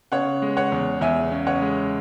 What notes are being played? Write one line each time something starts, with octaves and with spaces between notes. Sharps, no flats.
C#3 C#5 F#5
G#3
C#5 F#5
E2
E2 E5 G#5
C#3
C#5 F#5
G#3